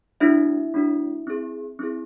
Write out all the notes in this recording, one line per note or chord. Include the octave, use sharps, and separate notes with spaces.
A3 D4 E4 F#4 E5
A3 D4 F#4
C4 E4 G#4
C4 E4 G#4